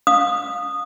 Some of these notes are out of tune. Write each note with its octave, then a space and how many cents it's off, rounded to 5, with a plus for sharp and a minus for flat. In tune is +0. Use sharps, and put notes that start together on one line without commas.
F5 +25 D#6 -15